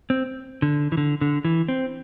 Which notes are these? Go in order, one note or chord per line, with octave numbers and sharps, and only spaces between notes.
C4
D3
E3
D3
D3
E3
C4